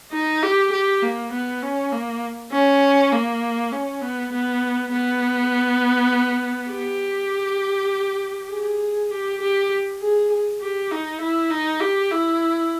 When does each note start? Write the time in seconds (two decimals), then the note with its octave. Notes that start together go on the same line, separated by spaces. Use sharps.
0.12 D#4
0.43 G4
0.72 G4
1.02 A#3
1.32 B3
1.62 C#4
1.92 A#3
2.52 C#4
3.12 A#3
3.72 C#4
4.01 B3
4.32 B3
4.92 B3
6.71 G4
8.51 G#4
9.11 G4
9.41 G4
10.01 G#4
10.61 G4
10.91 D#4
11.21 E4
11.50 D#4
11.80 G4
12.11 E4